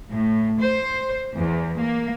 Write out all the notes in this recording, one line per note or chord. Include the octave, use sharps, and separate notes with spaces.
A2
C5
E2
A#3